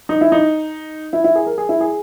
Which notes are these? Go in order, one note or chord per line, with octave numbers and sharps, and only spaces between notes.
D#4
E4
D#4
E4
E4
G#4
A#4
G#4
E4
G#4